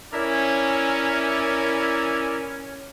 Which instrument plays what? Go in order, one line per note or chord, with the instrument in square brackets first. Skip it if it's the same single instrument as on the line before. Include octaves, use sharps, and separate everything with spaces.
[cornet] C#4 [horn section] E4 A#4 D5